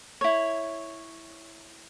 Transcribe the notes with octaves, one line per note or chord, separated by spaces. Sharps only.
E4 C#5